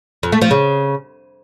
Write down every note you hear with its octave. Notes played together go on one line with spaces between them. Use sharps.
F2
A3
F3
C#3